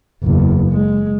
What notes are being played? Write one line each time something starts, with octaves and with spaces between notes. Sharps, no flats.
F#1 E2
G#3